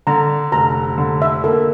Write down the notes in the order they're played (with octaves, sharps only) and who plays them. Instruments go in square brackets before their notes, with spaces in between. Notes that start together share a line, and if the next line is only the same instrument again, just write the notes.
[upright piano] D3 [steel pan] A#5
[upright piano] F1 [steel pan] A#5
[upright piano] D3
[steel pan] E5
[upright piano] A#3 [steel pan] A4